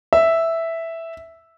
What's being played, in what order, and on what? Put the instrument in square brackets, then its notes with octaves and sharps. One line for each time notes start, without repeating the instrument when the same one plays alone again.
[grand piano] E5